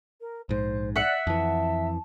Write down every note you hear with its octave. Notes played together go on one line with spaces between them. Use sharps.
A#4
A#1 G#2 C5
D5 E5 F#5
F2 E3 A5